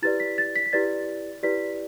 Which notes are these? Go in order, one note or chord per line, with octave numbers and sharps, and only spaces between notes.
E4 G4 B4 D5 A6
B6
A6
B6
B6
E4 G4 B4 D5 A6
E4 G4 B4 D5 B6